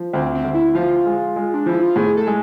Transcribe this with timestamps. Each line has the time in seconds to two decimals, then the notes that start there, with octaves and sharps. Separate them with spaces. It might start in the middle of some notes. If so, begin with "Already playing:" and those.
Already playing: F3
0.13 D2 C4
0.35 C4
0.44 D2
0.54 E4
0.74 F3 F4
1.06 G#3
1.36 G#3
1.54 D4
1.66 F3 E4
1.82 F4
1.96 A2 G#4
2.17 A4
2.27 G#3